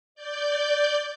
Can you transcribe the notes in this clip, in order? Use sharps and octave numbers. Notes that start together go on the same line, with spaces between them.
D5 G6